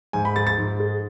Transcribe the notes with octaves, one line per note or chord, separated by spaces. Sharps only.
G#2 G#5
B5
G#3 A6
A6
G#2
G#3